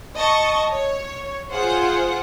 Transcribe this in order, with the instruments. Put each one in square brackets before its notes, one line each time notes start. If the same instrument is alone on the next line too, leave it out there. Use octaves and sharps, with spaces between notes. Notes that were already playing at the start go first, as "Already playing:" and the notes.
[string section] D#5 A5 C#6
C#5
F4 G#4 C5 F#5